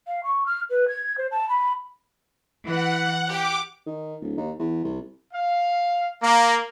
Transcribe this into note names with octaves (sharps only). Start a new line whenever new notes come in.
F5
C#6
F6
B4
G#6
C5
A5
B5
E3 F#5
G4 D6
D#3
D1
D#2
E2
C2
F5
A#3